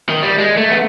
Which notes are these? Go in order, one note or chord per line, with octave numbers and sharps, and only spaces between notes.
D#3
G3
G#3
A3
B3